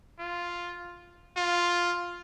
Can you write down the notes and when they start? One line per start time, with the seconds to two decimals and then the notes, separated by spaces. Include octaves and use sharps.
0.19 F4
1.37 F4